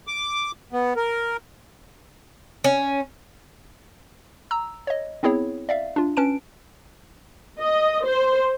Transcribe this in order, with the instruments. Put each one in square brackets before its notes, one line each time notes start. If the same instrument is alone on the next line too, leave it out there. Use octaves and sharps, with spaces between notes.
[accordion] D6
B3
A#4
[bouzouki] C#4
[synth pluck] A#5 E6
C#5 D#5
B3 C4 E4 G#4 C#5
D5 E5 F5
D4 F4
C#4 B4 A5 D7
[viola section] D#5
C5